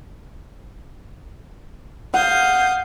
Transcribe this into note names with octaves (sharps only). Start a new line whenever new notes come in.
F5 F#5 D#6 G6